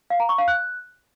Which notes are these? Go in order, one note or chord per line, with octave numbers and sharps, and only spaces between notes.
F5
A#5
C#6
F5
F#6